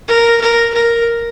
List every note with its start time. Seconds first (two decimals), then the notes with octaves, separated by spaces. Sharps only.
0.08 A#4
0.41 A#4
0.74 A#4